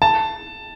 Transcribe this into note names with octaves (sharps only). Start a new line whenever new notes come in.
A5